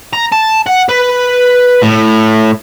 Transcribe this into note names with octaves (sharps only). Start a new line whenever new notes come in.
A#5
A5
F#5
B4
A2